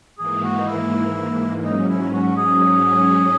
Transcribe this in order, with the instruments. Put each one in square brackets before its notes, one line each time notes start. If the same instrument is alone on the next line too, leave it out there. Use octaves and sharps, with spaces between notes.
[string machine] G#2 E3 A#3 [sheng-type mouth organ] G#4
[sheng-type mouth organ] F#4
D#4
E4
[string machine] G#2 F#3 C#4 [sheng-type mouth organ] D#4
[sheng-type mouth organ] E4
F#4
G#4